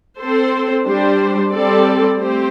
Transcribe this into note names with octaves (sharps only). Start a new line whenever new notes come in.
C4 A4 C5
G3 D4 C5
G3 C4 A4 D5
A3 C4 G4 C5